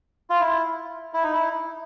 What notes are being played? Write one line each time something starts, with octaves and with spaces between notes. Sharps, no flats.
F4
E4
E4
D#4
E4